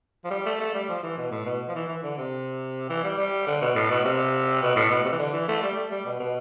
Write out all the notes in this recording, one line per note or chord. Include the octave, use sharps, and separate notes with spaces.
F3
G3
A3
A3
G3
F3
E3
B2
A2
B2
F3
E3
E3
D3
C3
E3
G3
G3
D3
B2
A2
B2
C3
B2
A2
B2
C3
E3
D3
E3
A3
G3
A3
G3
B2
B2